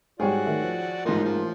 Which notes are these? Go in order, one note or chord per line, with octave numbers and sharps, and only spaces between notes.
G#2 G3 F#4 G#4 C#5 D5 G5
D#3 A3
F3
A1 G#2 F3 A#3 D#4 C6
F3